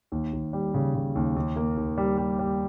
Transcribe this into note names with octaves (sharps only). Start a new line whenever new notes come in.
D#2
D#2
G3
C#3
C#3
D#2
D#2
A#3
D#2
G3
G3
G3